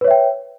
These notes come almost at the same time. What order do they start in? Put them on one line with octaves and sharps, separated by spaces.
B4 C#5 E5 G5